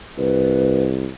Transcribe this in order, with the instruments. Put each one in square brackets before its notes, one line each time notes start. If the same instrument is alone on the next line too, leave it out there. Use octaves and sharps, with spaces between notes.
[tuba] C2 [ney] B4